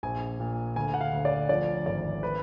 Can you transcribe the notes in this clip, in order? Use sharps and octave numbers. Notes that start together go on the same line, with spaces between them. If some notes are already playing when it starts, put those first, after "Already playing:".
A#1 G#5
A#2
D2 G#5
F#5
F5
D2
D5
F3 D5
G#1 D5
B4